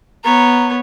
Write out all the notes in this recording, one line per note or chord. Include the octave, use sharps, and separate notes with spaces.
B3 C#5 A#5